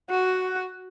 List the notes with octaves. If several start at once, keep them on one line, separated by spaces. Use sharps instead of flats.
F#4